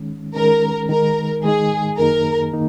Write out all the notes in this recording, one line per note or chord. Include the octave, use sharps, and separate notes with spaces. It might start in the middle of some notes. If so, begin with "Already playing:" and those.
Already playing: D#3 G#3 C#4
D#3 G#3 C#4 A#4
D#3 G#3 D#4 A#4
D#3 G#3 D#4 G#4
F#2 D#3 A#3 D#4 G#4 A#4
D#3 A#3 D#4